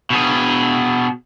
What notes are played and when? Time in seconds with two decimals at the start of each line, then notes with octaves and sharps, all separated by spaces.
0.10 B2 G#4